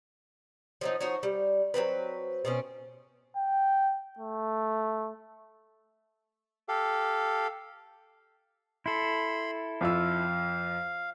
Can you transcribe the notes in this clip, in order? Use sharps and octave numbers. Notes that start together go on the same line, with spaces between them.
F3 F#3 D#4
F3 D#4 F#4 C#5
G3
F#3 G#3 C4 B4
B2 C4 C#4
G5
A3
G4 A4 F5
E4 A4 B5 C6
F2 F4 F5 E6